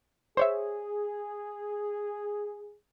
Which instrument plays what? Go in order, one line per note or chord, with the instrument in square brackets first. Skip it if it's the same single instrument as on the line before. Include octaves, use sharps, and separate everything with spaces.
[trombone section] G#4 [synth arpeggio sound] C5 C#5 E5